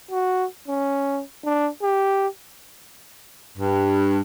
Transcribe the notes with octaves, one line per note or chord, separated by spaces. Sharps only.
F#4
C#4
D4
G4
G2